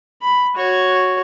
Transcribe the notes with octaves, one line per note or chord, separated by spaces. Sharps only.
B5
F#4 C#5